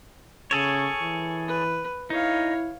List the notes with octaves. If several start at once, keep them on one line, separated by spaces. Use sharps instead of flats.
C#3 G#4 A4 C#5 C#6
E3
B4
D#4 E4 C#5 F5